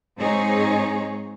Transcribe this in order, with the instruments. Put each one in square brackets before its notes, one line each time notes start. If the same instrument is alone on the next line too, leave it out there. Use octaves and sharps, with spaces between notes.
[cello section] G#2 C4 D#4 G#4 C#5